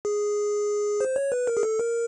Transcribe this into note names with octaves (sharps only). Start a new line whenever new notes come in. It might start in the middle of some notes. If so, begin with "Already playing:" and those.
G#4
C5
C#5
B4
A#4
G#4
A4
A#4